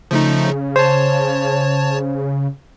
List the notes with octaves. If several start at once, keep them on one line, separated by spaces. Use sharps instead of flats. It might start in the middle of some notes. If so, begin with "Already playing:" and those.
C#3 F3 A3 D#4
C5 C#5 A5